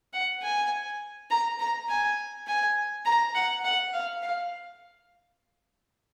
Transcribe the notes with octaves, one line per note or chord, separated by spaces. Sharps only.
F#5
G#5
A#5
A#5
G#5
G#5
A#5
F#5
F#5
F5
F5